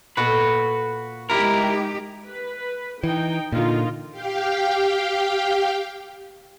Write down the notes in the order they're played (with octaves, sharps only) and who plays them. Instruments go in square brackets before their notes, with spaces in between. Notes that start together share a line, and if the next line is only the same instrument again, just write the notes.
[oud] A#2 A4 [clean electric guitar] F#4 B4
[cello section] G#3 D#4 G4 [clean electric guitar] E4 A#4
[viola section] B4
[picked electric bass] E3 [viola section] D#4 G5
[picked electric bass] A#2 D3 [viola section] A#3 D#4 F4
[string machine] G4 F5 G5